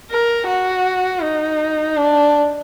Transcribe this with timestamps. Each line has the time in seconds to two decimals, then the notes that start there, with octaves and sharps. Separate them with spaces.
0.11 A#4
0.47 F#4
1.23 D#4
1.97 D4